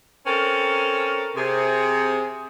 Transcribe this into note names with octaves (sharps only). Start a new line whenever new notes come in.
C4 C#4 A4 A#4
C3 G#4